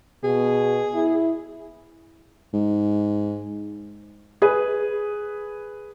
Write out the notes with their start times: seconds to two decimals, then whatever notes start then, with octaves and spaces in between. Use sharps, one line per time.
0.24 B2 G#4
0.94 E4
2.53 G#2
4.42 G#4 B4